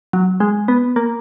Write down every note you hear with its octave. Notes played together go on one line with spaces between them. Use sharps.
F#3
G#3
B3
A#3